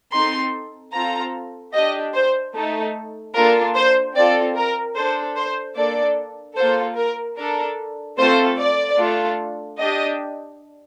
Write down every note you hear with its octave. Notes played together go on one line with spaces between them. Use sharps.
C4 D#4 A4 C6
C4 F4 A4 A#5
D4 G4 D#5
C5
A3 D#4 A4
A#3 D4 F4 A4 A#4
C5
C4 F4 A4 D5
A#4
D4 A4 C5
C5
A#3 D4 A4 D5
A#3 F4 A4 C5
A#4
D4 A4 A#4
A3 C4 F4 A4 C5
D5
A3 D4 F4 A4
D4 G4 D#5